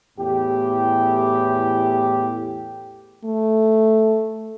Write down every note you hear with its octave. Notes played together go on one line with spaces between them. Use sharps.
E2 A2 G4
A3